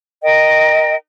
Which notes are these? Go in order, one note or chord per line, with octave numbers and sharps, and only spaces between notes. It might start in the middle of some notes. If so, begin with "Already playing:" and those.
A#4 D#5 G5